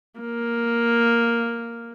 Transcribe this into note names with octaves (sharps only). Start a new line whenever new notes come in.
A#3